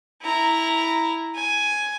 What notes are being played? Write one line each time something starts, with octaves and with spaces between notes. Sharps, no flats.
E4 A#5
G#5